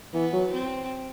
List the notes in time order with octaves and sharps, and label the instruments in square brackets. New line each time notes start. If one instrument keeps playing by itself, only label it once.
[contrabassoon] E3 [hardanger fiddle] B3
[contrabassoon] F#3
[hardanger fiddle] C4